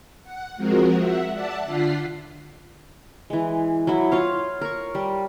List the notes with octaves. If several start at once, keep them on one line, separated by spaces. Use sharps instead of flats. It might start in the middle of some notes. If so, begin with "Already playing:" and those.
F#5
F3 G#3 C4 F#4 A#4
E5 F#5
D5 E5 F#5 A5
D3 F4 F#5 B6 C7
E3 G#3
F#3 E4
F4 C#5 F5
A#4 C#6
G3